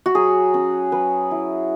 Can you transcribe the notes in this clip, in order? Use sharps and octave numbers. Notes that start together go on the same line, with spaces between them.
F#4
F#3 G#4
C#4
F#3 B4
E4